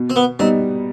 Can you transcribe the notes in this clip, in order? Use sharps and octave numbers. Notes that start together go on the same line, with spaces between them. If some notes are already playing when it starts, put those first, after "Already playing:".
Already playing: B2
C4
B3
G3 B3 C4 D#4